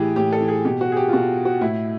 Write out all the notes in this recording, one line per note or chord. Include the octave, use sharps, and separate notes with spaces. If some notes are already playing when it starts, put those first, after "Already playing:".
Already playing: A2 E3 G4 G#4
A2 G4
A4
E3
G#4
B2 G4
F#4
G#4
G4
F4
B2 F#4
F#4
A2 E4